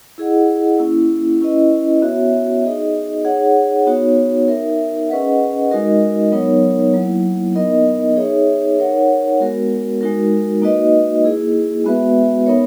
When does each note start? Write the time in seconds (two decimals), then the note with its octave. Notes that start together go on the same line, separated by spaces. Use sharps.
0.18 E4 G#4 D#5 F#5
0.79 A#3 C#4 E4
1.41 C#4 E4 B4 D#5
2.02 B3 F#4 C#5 E5
2.64 D#4 G#4 D#5
3.24 D#4 G#4 C#5 F#5
3.87 B3 D#4 F#4 C#5
4.48 D#4 A#4 E5
5.09 C#4 G#4 B4 D#5 F#5
5.70 G#3 D#4 F#4 A#4 D#5
6.32 F#3 B3 D#4 A#4 C#5
6.94 F#3 A#3 E4
7.55 B3 D#4 A#4 D#5
8.16 D#4 G#4 C#5 E5
8.78 D#4 A#4 C#5 F#5
9.40 G#3 B3 F#4 A#4
10.01 G#3 D#4 F#4 A#4
10.62 A#3 D#4 F#4 B4 D#5
11.24 A#3 E4 G#4
11.84 G#3 B3 F#4 B4 E5
12.46 B3 D#4 A#4 C#5